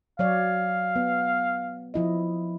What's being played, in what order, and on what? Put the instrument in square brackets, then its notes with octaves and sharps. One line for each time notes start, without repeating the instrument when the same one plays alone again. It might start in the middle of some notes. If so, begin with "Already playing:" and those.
[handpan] F#3 C#5 D5 [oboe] F5
[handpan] B3
F3 E4 D#5